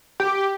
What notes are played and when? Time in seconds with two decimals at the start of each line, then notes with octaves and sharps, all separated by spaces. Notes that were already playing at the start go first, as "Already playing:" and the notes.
0.20 G4